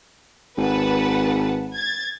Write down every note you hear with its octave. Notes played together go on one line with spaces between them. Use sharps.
G#1 B4 F#5 A5
G#6 A6